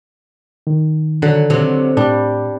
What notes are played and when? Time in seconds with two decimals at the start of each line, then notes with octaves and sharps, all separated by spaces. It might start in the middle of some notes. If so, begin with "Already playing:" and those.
0.67 D#3
1.22 D3 F#3
1.50 C3 F#3
1.97 A2 G3 D4